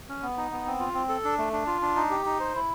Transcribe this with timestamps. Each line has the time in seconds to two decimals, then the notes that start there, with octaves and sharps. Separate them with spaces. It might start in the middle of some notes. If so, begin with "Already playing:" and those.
0.09 C#4
0.23 B3
0.37 D#4
0.51 B3
0.66 C4
0.80 F4
0.94 C4
1.09 A4
1.24 D4
1.39 A3
1.53 D4
1.67 F4
1.81 D4
1.96 D#4
2.11 G4
2.26 D#4
2.40 C5
2.55 E4